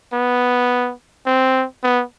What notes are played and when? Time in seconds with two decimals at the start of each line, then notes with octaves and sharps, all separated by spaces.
0.13 B3
1.26 C4
1.83 B3